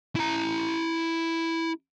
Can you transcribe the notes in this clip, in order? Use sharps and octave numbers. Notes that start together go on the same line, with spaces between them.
E4 A#5